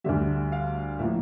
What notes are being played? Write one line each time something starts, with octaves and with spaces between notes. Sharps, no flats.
D2 D3 G3 E5
F5
A2 F3 A#3 E5